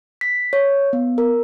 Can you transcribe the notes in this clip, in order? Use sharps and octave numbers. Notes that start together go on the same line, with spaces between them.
B6
C#5
B3
A#4